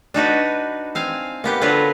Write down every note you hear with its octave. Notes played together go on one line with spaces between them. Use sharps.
D4 D#4 F#4 B4
C4 F5 G#5
A#3 B3 G4
D3 F#3 B3 F4 A#4 B4